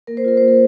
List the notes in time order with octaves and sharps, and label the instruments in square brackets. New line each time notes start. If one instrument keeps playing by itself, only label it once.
[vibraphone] A#3 A#4
C5
F4 A#4
A#3 C5
A#4